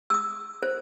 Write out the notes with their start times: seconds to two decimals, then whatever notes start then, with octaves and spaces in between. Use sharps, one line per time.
0.10 D#6 E6
0.63 C5